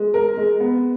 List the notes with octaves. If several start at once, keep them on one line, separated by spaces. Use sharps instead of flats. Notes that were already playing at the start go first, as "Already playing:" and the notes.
Already playing: G#3
A#4
G#3
B3